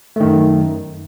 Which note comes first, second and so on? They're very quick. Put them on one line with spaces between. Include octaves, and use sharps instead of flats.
A3 D#3 F#2